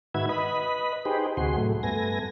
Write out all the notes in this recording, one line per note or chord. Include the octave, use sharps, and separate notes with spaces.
G#2 D#3 F#4 B4 E5 G#6
B4 D#5 B5
D#4 G4 G#4 B4 C5
D2 C3 F#4 G#4 C6
A2 F#3 A3
G2 A3 B3 G#5 A#6